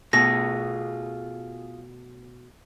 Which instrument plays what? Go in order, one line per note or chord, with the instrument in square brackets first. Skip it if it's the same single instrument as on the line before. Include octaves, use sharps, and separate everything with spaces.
[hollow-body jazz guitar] B2 A3 [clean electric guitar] F4 G#4 [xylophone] A#6